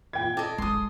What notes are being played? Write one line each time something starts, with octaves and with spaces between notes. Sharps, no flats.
A#2 G5 G#6
A4 D5 D#5
D1 G#1 G#3 C6 D#6